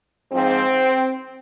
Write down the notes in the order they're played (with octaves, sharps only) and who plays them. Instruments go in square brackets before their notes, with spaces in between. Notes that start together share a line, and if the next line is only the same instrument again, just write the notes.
[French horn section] G#2 F3 C4